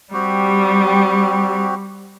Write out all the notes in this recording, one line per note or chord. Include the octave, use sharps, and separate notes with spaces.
G3 C4 F#4 G4